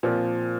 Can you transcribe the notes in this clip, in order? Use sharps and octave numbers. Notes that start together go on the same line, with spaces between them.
A#2 F3 C4